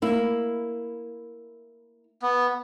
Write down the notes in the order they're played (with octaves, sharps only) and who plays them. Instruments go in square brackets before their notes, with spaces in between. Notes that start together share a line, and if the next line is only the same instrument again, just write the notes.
[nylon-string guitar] A#3 E4
[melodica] B3